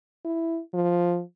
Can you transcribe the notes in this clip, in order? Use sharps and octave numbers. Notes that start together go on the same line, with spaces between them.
E4
F3